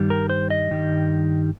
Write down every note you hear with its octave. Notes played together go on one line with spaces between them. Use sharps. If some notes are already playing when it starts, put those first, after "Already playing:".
Already playing: G2 D#3 G3
A#4
C5
D#5
G2 D#3 G3